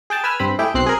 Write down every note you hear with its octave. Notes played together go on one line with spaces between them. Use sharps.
G#4 G5 A5
B4 G#5 E6 F6
G2 C4 B5
A3 E4 G4 G#4 E5 G5
B1 C4 F#6 C7
G#4 A#4